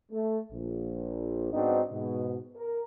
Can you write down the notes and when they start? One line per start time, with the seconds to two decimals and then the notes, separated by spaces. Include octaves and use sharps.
0.12 A3
0.52 A#1
1.53 G#2 B3 C4 D4 D#4 F#4
1.92 G#2 B2
2.56 A#4